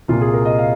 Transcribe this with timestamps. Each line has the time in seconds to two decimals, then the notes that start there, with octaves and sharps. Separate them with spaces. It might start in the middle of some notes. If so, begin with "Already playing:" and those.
0.08 C2 A#2 A#3 F4
0.21 G#4
0.34 A#4
0.45 D#5
0.59 F5